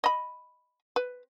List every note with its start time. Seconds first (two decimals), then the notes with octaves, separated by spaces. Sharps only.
0.04 D#5 B5
0.96 B4